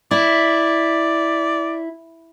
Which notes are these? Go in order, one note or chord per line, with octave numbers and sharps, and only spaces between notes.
E4 D5